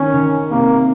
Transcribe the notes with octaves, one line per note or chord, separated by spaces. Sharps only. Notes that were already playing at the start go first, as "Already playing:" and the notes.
Already playing: D#3 C#4
D#3
C3 A#3